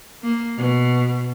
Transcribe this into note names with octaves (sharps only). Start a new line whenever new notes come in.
A#3
B2